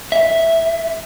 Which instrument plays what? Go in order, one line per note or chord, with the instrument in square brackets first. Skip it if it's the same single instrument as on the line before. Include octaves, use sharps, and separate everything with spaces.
[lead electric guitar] E5